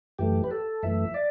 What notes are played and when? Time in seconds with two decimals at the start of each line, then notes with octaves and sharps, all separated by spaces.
0.19 F#2 E3 A3 G4
0.44 B4
0.51 A4
0.83 F#2 E3 A3 E5
1.14 D5